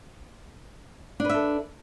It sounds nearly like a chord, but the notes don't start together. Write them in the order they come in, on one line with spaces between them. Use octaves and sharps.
D4 B4 E5 A4